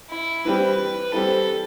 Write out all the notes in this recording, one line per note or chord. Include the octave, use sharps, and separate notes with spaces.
E4
E3 G3 C4 G4 B4
E3 G3 C4 G4 A4